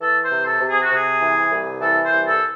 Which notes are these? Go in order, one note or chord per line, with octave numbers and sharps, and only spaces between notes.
E3 A4
C5
C3
A4
C3
G#4
F#4
C3 G#4
E3
C2
E3 A4
C5
C2
A4